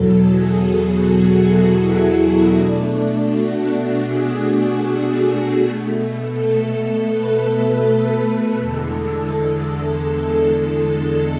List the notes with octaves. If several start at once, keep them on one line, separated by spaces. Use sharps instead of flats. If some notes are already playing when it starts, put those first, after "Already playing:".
Already playing: E2 B2 F#3 A4
G#4
F#4
E4
F#4
B2 A3 D4
F#4
G#4
B2 A3
A4
B4
A4
A4
E2 D3 G#3
A4